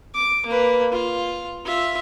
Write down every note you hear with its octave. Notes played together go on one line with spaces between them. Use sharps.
D6
A#3 B4
F4
F4 E5